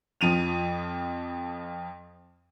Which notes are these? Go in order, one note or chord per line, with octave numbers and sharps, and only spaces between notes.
F2 F3 D#7 F7